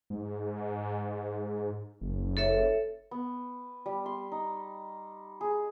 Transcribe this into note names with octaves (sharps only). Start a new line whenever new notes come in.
G#2
F#1
A4 C#5 E5
B3
G3
C6
D#4
G#4